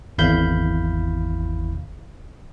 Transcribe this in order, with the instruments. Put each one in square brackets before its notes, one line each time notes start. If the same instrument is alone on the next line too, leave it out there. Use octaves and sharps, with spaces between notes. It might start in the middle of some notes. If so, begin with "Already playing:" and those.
[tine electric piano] G#1 E2 E4 F5 B5 G6